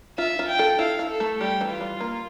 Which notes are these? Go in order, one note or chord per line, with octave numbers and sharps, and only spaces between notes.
F4 E5
F4
G5
A4
E4 F5
E4
A4
A3
G3 G4
E3
F4
G3
A#3